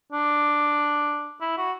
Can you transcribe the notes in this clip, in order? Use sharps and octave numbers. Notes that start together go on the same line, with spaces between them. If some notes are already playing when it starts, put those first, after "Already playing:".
D4
E4
F#4